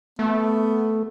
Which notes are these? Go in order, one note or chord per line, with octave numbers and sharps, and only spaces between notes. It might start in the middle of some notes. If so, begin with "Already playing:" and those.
A3 B3